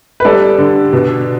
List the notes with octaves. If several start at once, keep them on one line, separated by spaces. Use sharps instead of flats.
B4
G3 A4 D5
D3
B2